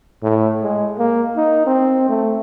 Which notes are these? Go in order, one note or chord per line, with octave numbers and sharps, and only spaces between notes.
A2
G#3
A#3
D#4
C4
A3